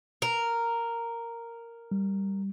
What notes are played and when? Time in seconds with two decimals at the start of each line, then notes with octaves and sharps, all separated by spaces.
0.22 A#4
1.91 G3